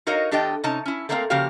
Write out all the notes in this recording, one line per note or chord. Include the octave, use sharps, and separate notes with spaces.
D#4 F#4 A#4 C#5 D#5 F5
E2 D4 G4 A4 D#5 G5
C3 C#4 D#4 A5
C#4 E4
A3 A#3 C4 A#4 E5 F5
C#3 F3 A#3 F#4 G4 F5